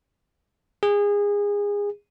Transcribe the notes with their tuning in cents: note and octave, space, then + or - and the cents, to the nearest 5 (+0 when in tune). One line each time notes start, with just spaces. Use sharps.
G#4 -25